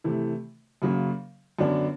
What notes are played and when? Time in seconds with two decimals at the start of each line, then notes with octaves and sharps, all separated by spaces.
0.04 C3 E3 A3
0.82 F#2 C#3 F#3 A#3
1.59 F#2 D3 F#3 B3 D4